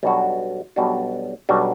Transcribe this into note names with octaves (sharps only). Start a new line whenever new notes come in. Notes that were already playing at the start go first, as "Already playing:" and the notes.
B1 B2 G3 D4 F#4
B1 B2 G3 D4 F#4
B1 B2 G3 D4 F#4